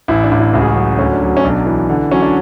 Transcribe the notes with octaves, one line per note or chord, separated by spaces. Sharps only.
A1 E4
D4
A1
E4
C#2 F#4
G#4
F#4
F#3
D2 C#4
D4
F#3
C#4
B1 D4
E3
D3
F#3 C#4
D4